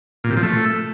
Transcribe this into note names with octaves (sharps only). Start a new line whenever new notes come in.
A#2
C3
F3
A3